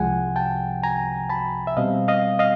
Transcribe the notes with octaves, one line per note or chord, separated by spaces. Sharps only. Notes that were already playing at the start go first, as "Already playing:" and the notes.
Already playing: C2 C3 F3 G#3 F#5 G#5
G5 A5
G#5 A#5
A5 B5
E5
B2 G3 C4 D#5 F5
D#5 F5
D#5 F5